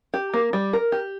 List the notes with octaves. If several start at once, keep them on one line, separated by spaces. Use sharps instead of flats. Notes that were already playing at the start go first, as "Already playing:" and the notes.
G4
A#3
G3
A#4
G4